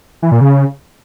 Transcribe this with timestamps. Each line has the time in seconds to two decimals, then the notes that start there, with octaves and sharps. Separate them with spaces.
0.22 E3
0.32 A#2
0.41 C#3